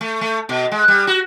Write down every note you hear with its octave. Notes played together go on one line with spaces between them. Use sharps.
A3
A3
B2
G#3
G3
F#4